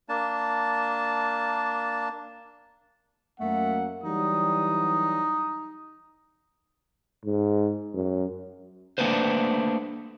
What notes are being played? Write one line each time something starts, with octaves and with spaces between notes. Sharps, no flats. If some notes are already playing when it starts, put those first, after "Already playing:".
A#3 D4 A5
F#2 A3 A#3 F#5
E3 F#3 G3 D#4 D#6
G#2
F#2
A3 A#3 D4 B4 C5